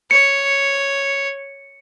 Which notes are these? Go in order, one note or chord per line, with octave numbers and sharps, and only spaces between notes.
C#5 C#7